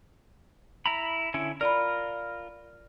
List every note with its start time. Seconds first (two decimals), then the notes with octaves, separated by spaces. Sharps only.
0.86 E4 A#5 B5
1.34 D3 C#4 E4
1.61 F4 A#4 D5 B5